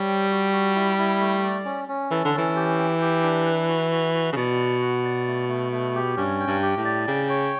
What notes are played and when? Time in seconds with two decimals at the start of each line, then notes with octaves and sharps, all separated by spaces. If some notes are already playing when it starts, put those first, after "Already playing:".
Already playing: G3 C#5
0.08 G5
0.31 F#4
0.53 F#4
0.76 E4
0.98 E4
1.20 A3
1.43 D5
1.65 C#4
1.88 C#4
2.11 E3 A4
2.25 D3
2.34 E3 C#4
2.56 G4
2.79 G5
3.02 G4
3.23 D4
3.46 B4
3.68 F#4
3.91 F#4
4.14 F#4
4.33 C#3
4.36 B2 D5
4.59 F#4
4.82 F#5
5.04 D5
5.27 A3
5.49 A3
5.72 A3
5.95 G4
6.17 G2 C#4
6.40 G5
6.47 G2
6.63 G4
6.77 A2
6.85 D5
7.07 C#3 G5
7.30 C#5